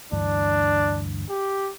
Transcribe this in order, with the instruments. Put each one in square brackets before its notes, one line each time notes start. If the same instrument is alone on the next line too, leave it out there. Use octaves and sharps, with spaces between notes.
[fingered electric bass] D2 G2 E3 [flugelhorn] D4
[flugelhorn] G4